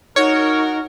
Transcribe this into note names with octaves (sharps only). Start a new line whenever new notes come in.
D#4 F#4 A#4 C#5